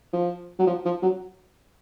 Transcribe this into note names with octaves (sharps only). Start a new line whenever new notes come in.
F3
F#3
F3
F3
F#3